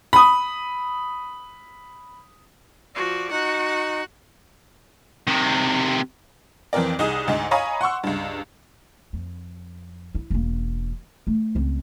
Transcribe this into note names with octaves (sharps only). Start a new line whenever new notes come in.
B5 D#6
F3 F#4 D5
D#4 F#4 F#5
C3 D#3
F2 E3 C4 A#4 D5
C2 D#4 G#4 D#6
D2 G#2 D#4
C#5 D#5 F5 G#5 A#5 B5
F#5 C6 C#6 E6
C#2 G2
F2
E4
E1 A#3
A3
C#2 C4